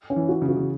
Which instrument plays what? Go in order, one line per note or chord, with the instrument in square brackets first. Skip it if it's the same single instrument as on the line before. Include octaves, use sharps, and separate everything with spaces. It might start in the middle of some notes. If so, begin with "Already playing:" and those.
[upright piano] C#4
[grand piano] E3
[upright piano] F#4
[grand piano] C#3
[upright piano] F#4
[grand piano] C#3